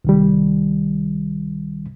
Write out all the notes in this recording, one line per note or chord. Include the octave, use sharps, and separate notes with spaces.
C2 D#3 G3